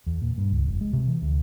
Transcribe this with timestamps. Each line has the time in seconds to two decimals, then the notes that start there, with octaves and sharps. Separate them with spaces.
0.06 E2
0.22 A#2
0.38 G2
0.52 C#2
0.67 F1
0.81 G#3
0.93 C3
1.07 E3
1.22 D2